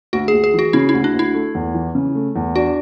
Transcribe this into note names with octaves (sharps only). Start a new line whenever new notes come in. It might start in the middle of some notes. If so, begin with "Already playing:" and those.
D2 F#4
G#4
D2
G#4
E3 F#4
C#3 E4
E4
D2
D4
D2 E4
A3
E2
E3
C#3
A3
E2
D4 F#4